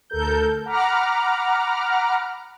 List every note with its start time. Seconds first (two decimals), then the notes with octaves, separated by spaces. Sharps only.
0.10 D2 A4 A#4 G6
0.66 F#5 A#5 B5 D6 F6